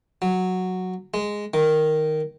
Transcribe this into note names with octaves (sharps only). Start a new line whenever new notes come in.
F#3
G#3
D#3